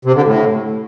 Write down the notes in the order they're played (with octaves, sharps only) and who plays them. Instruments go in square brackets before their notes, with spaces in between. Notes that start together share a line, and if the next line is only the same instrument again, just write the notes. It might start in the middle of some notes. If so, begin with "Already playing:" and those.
[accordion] C3
D3
A2